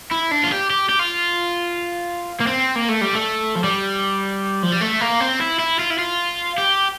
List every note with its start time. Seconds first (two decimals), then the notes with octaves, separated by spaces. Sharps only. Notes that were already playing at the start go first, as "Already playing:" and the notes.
0.12 E4
0.32 D4
0.44 F4
0.51 G4
0.70 G4
0.89 G4
0.99 F4
2.40 A#3
2.47 C4
2.76 A#3
2.89 A3
3.01 G3
3.15 A3
3.56 F3
3.64 G3
4.63 F3
4.72 G3
4.81 A3
5.01 A#3
5.20 C4
5.40 E4
5.59 E4
5.79 F4
5.90 E4
5.99 F4
6.58 G4